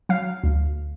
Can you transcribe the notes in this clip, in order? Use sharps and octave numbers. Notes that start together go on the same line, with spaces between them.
F#3 F5
D2